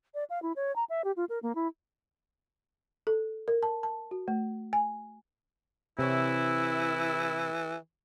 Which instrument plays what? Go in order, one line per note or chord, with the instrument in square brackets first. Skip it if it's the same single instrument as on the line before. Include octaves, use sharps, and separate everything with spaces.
[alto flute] D5
F5
E4
C#5
A#5
E5
G4
F4
A#4
A#3
E4
[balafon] A4
A#4
A5
A5
F#4
A3
G#5
[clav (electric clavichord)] C3 C#5 [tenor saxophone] E3 [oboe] E4